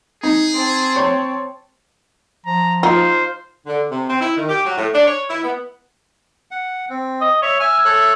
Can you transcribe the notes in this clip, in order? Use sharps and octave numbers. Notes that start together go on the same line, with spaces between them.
D#4 G#4
C4 A5
C#5 C6
F3 A#5
D#4 F4 C5
D3
C3
C4
E4
D#3
G4
F#3
A2
D4
C#5
E4
B3
F#5
C4
D#5
C#5 E5
E5 G#5 F6
A4 C#5 F#6